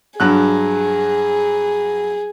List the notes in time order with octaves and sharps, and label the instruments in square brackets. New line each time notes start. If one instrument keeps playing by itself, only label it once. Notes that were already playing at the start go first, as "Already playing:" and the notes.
[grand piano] G2 F#3 F#6 [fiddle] G#4